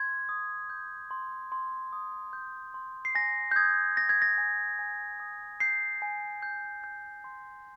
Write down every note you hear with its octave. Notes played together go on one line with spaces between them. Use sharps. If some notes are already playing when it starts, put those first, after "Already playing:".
Already playing: C6 G#6
D#6
G6
C6
C6
D#6
G6
C6
C7
G#5 A#6
G6
D#6 G#6
G6 A#6
G#6
A#6
G#5
G#5
D#6
G6 C7
G#5
G6
G6
C6